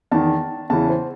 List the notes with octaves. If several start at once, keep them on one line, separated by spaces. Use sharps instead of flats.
E2 D#3 A5
E2 C#3 E3 A5
C5